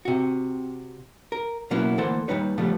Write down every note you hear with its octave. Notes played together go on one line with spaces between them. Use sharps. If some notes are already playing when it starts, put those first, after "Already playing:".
C3 F#4
A#4
B2 F#3 A#3 B3 C#4 E4
D2 E3 A#3 A4 C5 F#5
D#2 E3 G3 D#4 B4 C#5
C#3 F3 G3 A3 B3